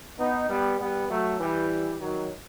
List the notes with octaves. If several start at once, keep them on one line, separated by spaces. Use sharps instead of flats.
B3 D#4
G3 B3
G3 B3
F#3 A3
E3 G3
D#3 F#3